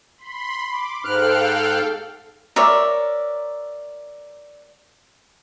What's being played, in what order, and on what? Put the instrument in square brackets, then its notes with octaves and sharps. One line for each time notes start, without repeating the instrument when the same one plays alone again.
[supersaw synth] B5 C6
D6
[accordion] G#2 F6 F#6 [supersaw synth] A4 F5 G5
[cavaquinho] A#4 C#5 D5 E5